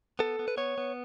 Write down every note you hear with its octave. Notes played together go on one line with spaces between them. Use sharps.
B3 A4
B3
B4
B3 C#5
B3